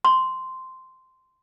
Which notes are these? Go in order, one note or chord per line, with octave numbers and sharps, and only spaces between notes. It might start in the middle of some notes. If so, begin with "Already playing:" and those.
C6